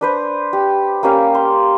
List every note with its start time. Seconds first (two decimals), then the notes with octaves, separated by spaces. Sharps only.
0.01 D4 B4 C5
0.53 G4
1.03 A#3 C#4 G4 F5
1.35 C6